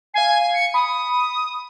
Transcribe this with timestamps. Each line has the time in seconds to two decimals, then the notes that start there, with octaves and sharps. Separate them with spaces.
0.14 F5 G#5 C7
0.54 C#7
0.74 B5 D#6